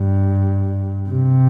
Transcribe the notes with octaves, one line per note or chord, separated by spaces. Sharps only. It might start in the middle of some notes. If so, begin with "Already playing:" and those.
Already playing: G2
C3